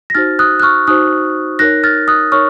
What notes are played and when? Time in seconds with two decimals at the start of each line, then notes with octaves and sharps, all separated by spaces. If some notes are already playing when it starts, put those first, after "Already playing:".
0.10 A#6
0.15 D#4 F#4 C5 F6 A6
0.39 D#6 F#6
0.60 F#6
0.62 C#6 F6
0.87 D#4 F#4 C5 D#6 F#6
1.59 D#4 A#4 C#5 F#6 A#6
1.84 F6 A6
2.08 D#6 F#6
2.32 D#4 A#4 C#5 C#6 F6